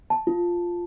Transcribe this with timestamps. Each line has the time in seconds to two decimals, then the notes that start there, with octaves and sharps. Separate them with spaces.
0.10 A5
0.27 F4